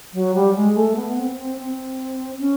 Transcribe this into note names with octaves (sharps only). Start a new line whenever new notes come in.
F#3
G3
G#3
A3
B3
C4
C4
C4
C#4